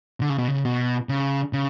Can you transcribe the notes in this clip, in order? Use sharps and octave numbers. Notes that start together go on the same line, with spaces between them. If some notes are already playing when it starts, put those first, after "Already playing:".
D3
C#3
B2
C#3
B2
C#3
C#3